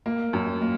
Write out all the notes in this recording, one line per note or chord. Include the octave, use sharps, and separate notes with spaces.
A#3
F#2
A#3